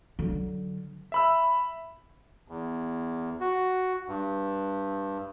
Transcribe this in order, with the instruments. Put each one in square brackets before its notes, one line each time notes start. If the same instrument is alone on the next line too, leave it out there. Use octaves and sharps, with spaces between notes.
[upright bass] D3 F#3
[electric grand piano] E5 B5 E6
[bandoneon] E2
F#4
G2